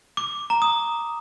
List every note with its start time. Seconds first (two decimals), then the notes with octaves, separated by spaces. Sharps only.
0.17 D6
0.50 A#5
0.62 D#6